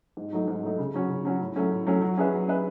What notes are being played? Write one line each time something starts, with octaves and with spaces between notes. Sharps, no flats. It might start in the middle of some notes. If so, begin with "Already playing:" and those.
G#2
F#3 A3 D#4
G#2
F#3 A3 D#4
C#3
F#3 C#4 F#4
C#3
F#3 C#4 F#4
A2
F#3 A3 C#4
A2
F#3 A3 C#4
F#3
C#4 G#4 B4 E5
F#3
C#4 G#4 B4 E5